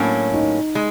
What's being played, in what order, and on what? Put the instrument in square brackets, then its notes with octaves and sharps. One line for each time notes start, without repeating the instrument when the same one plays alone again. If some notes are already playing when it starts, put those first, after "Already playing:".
Already playing: [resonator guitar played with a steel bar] A2 F#3 A#3 C#4 [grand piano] D4
[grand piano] D#4
[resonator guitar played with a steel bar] G#3